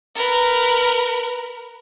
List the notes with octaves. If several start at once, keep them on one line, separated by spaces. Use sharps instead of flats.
A#4 B4